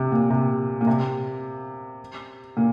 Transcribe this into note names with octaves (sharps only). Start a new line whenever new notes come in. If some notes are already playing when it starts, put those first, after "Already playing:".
Already playing: C3
A#2
C3
A#2
C3
A#2